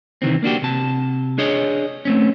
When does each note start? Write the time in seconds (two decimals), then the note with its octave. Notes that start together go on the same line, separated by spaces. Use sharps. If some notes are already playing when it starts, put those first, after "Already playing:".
0.22 C3 D#3 E3 C4
0.43 A#3 D4 F#4 G4
0.62 C3 A5
1.38 D4 G#4 C#5 D#5
2.05 A3 C4 C#4